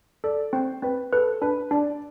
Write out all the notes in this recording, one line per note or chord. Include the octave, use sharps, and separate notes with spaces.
A4 D5
C4 C5
C4 B4
A4 B4
D4 B4
D4 D5